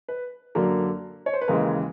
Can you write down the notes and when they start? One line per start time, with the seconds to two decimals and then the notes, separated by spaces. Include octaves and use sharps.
0.08 B4
0.55 F#2 D3 F#3 A#3 A#4
1.26 C#5
1.34 C5
1.41 B4
1.48 D#2 C#3 E3 G#3 A#4